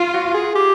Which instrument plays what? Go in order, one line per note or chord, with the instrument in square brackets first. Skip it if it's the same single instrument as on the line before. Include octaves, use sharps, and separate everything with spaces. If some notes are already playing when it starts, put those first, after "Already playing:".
Already playing: [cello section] F4
[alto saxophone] F#4
G#4
G4